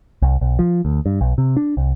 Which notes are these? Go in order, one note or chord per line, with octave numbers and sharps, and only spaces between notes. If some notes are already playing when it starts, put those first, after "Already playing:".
C2
B1
F3
D2
G2
B1
C3
D4
C2